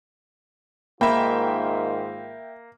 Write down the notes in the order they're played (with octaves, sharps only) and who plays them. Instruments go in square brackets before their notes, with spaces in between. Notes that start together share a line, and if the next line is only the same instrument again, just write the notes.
[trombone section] G#2 D#3 F4 [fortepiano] A#3 [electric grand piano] E5 G5 [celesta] B5